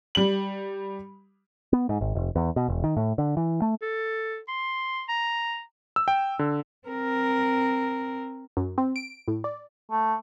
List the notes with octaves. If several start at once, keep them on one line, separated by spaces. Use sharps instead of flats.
G3 F#7
B3
G#2
G#1
F1
E2
B2
E1
D#3
A2
D3
E3
A3
A4
C6
A#5
E6
G5
D3
C4 A#4
F#2
C4
D7
A2
D5
A3